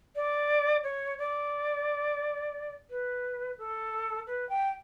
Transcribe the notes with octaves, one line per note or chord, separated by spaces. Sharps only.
D5
C#5
D5
B4
A4
B4
G5